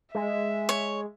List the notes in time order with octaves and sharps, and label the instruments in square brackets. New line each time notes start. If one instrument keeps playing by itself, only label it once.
[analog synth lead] G#3 [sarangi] E5
[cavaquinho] C#5